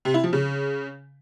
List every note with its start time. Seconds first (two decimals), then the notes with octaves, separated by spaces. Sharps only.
0.05 C3
0.14 E4
0.24 F3
0.33 C#3